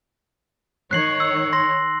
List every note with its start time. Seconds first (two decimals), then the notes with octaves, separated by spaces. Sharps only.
0.91 D#3 C#5 F#6 C7 F#7
1.20 E6
1.53 C6 A#6